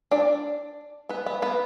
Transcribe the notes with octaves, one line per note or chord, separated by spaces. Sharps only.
D4 D5
B3 B4
B3 B4
B3 B4